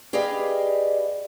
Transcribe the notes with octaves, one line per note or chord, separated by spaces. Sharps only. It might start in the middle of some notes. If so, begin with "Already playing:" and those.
G4 G#4 B4 D5 D#5 F5